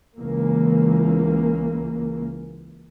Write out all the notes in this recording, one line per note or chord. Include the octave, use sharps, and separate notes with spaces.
C#2 E3 A#3